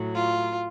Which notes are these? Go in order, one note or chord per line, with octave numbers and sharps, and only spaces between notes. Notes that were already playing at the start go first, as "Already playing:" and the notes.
Already playing: A2 F#3
F4